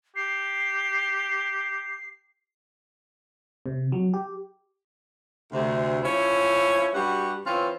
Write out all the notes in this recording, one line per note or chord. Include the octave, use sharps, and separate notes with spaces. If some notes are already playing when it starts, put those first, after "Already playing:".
G4 C7
C3
F#3
G4
D2 C3
F3 C#4 E4
G2 G3 F#4 F#5
E3 C4 C#4 F4